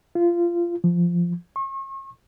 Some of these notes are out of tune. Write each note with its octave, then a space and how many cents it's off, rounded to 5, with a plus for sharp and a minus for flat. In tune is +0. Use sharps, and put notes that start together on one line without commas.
F4 -20
F3 -10
C#6 -40